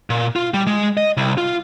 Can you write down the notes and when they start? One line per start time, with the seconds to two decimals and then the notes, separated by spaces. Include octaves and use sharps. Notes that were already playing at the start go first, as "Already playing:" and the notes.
0.10 A#2
0.36 F4
0.54 G3
0.67 G#3
0.97 D#5
1.17 C2
1.38 F4